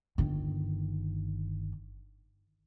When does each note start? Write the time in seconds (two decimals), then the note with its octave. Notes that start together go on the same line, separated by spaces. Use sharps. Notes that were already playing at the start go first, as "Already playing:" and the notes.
0.18 G1 D#3